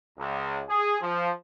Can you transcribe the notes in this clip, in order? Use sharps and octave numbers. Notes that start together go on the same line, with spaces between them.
C#2
G#4
F3